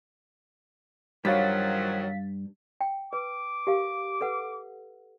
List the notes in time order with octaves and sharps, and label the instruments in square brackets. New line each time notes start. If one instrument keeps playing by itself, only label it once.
[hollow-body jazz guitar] G2 [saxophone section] D#3 F3 F#3 [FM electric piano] F5 A6 B6
[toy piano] G5
[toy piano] B4 [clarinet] D6
[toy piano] G4 A#4 F5
A4 B4 F#5